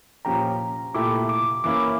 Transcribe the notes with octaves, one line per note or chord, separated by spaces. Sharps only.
A#2 F3 C#4 G4 A#5
A#2 A3 E4 G4 D6
D6
E3 A#3 C#4 E4 D6